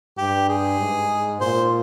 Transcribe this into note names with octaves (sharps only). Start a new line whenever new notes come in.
G2 G4
G#4
G#2
A#2 C5